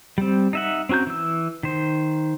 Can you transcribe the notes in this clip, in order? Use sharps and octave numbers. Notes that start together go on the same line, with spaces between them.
G3 C4
D#4 E5 F#5
C4 C#4 F#4 A#5 G6
E3 E6
D#3 C5